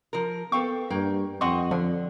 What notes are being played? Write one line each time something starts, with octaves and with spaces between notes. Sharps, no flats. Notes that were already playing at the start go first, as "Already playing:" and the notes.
F3 A#4
B3 A4 F5 G5 C#6
G2 A#3 G5
F2 C4 D#5 F#5 C6 C#6
D3 F3